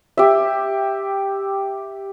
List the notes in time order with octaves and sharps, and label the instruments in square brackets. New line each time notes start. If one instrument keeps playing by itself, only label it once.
[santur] G4 E5